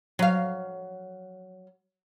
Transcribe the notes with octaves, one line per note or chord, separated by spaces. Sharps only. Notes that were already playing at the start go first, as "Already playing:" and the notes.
F#3 F5